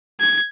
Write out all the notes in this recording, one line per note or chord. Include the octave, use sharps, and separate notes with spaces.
G#6